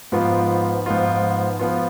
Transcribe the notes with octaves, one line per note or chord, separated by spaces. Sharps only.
G#2 F3 B3 F4
G#2 F3 B3 F4
F3 B3 F4